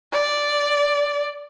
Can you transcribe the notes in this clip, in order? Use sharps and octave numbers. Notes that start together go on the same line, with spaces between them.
D5